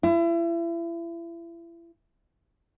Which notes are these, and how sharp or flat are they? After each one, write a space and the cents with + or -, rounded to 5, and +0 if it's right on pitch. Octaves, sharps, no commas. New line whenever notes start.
E4 +35